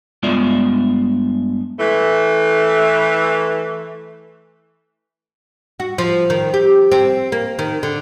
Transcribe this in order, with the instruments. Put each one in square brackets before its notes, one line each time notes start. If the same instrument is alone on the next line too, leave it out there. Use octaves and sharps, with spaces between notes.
[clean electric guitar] G2 G#3 B3 F4 D5 E5
[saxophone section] E3 A3
[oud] F#4
F3
D#3
G4
C4
A#3
D#3
D3